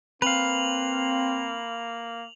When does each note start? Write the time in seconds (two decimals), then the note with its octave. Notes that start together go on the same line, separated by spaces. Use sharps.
0.22 A#3 C4 B4 F5 F7 F#7